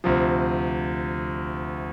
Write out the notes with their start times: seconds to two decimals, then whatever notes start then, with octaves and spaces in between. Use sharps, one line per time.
0.04 D2 C3 F3